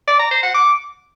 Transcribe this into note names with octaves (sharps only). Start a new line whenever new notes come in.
D5
A#5
C5
F#5
D6